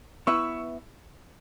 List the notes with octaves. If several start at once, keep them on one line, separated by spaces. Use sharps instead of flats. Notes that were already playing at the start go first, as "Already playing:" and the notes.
B3 E4 B4 E5 C#6 E6